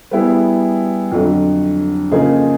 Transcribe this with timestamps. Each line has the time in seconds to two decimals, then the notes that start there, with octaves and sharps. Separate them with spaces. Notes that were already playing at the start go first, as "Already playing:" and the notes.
0.11 G3 B3 E4 G#4
1.12 F2 D3 F#3
2.11 C#3 F3 A#3 D#4 G#4